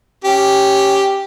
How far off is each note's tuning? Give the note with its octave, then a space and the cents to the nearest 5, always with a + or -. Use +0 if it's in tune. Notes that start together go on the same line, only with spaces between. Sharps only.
C#4 +0 G4 +0